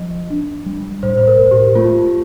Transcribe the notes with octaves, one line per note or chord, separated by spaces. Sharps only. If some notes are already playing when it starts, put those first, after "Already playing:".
Already playing: F3 D#5
D4
G3
A2 C5
C5
A#4
A2
G4
A3 F4